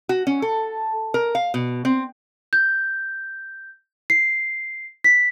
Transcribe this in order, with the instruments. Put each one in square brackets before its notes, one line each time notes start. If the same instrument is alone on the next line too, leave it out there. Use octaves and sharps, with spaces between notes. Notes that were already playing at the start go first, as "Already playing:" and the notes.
[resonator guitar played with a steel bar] F#4
C#4
A4
A#4
F5
B2
C4
[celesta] G6
C7
B6